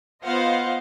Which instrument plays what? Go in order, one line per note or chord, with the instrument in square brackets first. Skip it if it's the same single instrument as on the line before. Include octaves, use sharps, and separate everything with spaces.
[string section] B3 F4 C5 D#5 F5 F#5